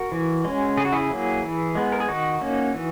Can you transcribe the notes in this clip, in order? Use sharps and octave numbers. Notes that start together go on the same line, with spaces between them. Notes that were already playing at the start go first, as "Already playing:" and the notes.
Already playing: F#4 A#4
E3
G#3 C#4
C#3 G#4
F#4
E4 G#4
F#3 A#3
E3
G#3 B3
A#4
G#4
D#3 D#4 F#4
A#3 C#4
E3